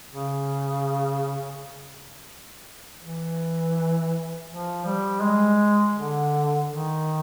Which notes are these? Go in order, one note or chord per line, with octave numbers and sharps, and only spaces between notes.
C#3
E3
F3
G3
G#3
D3
D#3